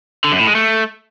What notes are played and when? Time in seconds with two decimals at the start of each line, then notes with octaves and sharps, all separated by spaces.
0.24 D3
0.32 F#2
0.40 A2
0.47 G#3
0.55 A3